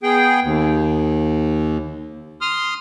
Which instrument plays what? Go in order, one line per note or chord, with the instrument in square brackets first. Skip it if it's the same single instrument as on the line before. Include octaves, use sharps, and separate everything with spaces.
[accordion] B3 G#4 G5
D#2
C6 D#6 F6